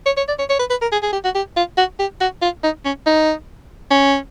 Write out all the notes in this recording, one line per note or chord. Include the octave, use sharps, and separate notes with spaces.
C#5
C#5
D5
C#5
C#5
B4
B4
A#4
G#4
G#4
G4
F#4
G4
F4
F#4
G4
F#4
F4
D#4
C#4
D#4
C#4